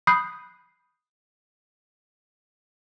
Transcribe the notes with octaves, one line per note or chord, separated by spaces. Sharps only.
B5 D#6 F#6 G6 C7